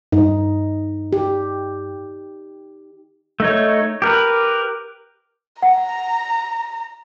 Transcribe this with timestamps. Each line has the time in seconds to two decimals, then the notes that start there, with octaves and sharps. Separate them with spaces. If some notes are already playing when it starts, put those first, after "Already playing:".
0.12 G2 D#4
1.13 G4
3.40 A3 D#4 C#5
4.02 G4 A#4 B4
5.63 F#5 A#5